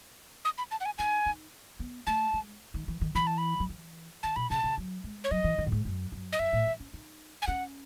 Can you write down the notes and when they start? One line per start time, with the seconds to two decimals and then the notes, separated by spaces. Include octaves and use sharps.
0.45 D#6
0.58 B5
0.71 A5
0.81 F#5
0.86 G#5
0.98 D#4 G#5
1.26 D#4
1.79 B3
2.07 A3 A5
2.34 G#3
2.74 D#3
2.88 E3
3.01 D#3
3.15 E3 B5
3.27 A5
3.38 B5
3.60 F#3
3.69 E3
4.23 D#3 A5
4.36 B2 B5
4.50 C#3 A5
4.64 C#3
4.78 F#3
5.04 G#3
5.24 C#5
5.31 F#3 D#5
5.44 E3
5.58 D#3
5.66 A2
5.72 G#2
5.85 F#2
6.12 F#2
6.33 D#5
6.39 F#2 E5
6.53 A2
6.67 E3
6.80 C#4
6.93 D#4
7.42 G#5
7.47 C#4 F#5